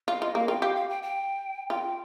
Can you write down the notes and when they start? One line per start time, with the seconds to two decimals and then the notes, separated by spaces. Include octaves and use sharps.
0.08 F4 F5
0.22 F4 D#5
0.35 A#3 F5
0.48 F4 G5
0.62 G4 F5
0.76 F5
0.89 G5
1.03 G5
1.70 F4 G5